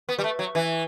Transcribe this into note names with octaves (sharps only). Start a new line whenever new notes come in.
B3
G3
A3
F#3
E3